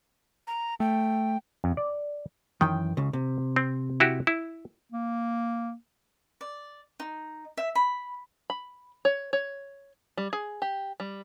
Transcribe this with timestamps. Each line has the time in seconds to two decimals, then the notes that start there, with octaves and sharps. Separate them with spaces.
0.47 A#5
0.80 A3 G5
1.64 F2
1.77 D5
2.61 F#2 D#3 E3 G5
2.97 C#2 C#3
3.13 C3
3.56 C4
4.00 E4 F#4 G4
4.27 E4
4.92 A#3
6.41 D5
7.00 D#4
7.57 E5
7.75 B5
8.50 B5
9.05 C#5
9.33 C#5
10.17 G3
10.33 G#4
10.62 G4
11.00 G3